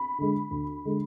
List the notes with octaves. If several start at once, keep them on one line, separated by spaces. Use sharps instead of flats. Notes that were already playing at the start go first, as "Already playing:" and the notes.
Already playing: B5
D3 G#3
D2
D3 G#3